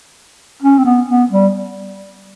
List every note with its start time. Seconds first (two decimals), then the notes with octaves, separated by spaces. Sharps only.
0.62 C#4
0.78 C4
0.85 B3
1.08 B3
1.31 G3